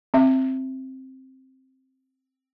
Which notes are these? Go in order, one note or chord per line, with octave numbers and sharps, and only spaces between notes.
C4 E5